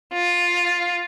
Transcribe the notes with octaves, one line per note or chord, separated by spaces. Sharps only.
F4